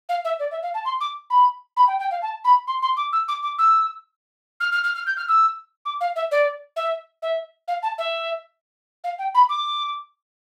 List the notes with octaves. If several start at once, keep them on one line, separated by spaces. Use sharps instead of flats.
F5
E5
D5
E5
F5
A5
C6
D6
B5
B5
G5
G5
F5
A5
B5
C6
C6
D6
E6
D6
D6
E6
F6
F6
F6
F6
G6
F6
E6
D6
F5
E5
D5
E5
E5
F5
A5
E5
F5
G5
B5
D6